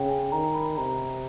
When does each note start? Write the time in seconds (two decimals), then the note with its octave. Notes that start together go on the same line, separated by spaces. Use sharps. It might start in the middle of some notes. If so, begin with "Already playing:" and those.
Already playing: C#3 G5
0.09 G#5
0.32 D#3 A#5
0.55 B5
0.77 C3 A#5